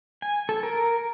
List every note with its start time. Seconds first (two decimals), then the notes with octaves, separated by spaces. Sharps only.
0.22 G#5
0.49 A4
0.63 A#4